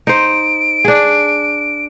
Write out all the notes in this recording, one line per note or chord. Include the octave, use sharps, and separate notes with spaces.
D#4 C5 D7
D4 G#4